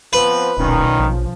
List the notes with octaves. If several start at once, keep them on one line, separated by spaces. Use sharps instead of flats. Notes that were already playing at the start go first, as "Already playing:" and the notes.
F3 B3 C4 B4
D#1 B1 A#2 D#3 C#4
A#1 F3